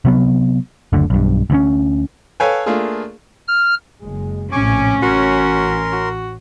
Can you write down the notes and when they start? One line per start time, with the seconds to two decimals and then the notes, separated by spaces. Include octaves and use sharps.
0.05 C3 F#3 B3
0.93 F#1 D2 D3
1.10 B1 G2
1.50 D2 E3 C#4
2.40 A4 B4 C#5 F5 G5 G#5
2.66 A3 A#3 D4 F4 G#4
3.48 F6
4.01 F#1 G#3
4.52 A#1 A2 C3 C#4 G#5 C#6 D6
5.02 A1 F#4 A#4 C6
5.92 F#4